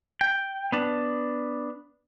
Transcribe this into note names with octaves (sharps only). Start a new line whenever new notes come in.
G5
B3 D4